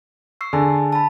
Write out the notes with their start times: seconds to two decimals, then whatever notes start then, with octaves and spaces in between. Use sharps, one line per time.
0.41 C#6 E6 C7
0.53 D3 G#4 G#5 A5
0.93 A5 B5